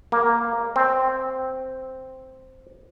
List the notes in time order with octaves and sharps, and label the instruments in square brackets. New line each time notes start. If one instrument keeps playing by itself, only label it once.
[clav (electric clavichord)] A#3
C4